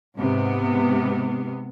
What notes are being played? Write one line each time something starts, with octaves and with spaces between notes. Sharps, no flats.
G#2 C3 B3